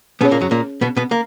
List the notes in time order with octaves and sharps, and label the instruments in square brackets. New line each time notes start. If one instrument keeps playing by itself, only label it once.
[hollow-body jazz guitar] B2 B3 [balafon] C#4 G#4 C#5
[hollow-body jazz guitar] A#2 A#3
F#2 F#3
A#2 A#3
B2 B3
B2 B3
A#3